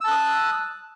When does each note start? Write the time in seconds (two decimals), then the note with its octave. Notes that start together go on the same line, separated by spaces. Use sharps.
0.01 E6
0.04 A5
0.08 F#6
0.11 D#6